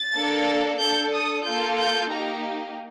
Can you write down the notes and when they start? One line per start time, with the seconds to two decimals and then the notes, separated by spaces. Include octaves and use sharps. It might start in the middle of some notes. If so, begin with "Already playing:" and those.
Already playing: A6
0.16 A#3 D4 A4
0.81 D4 A4 G6
1.14 D#6
1.46 A#3 F4 A4 G6
1.79 G6
2.11 A#3 D#4 G4 A#5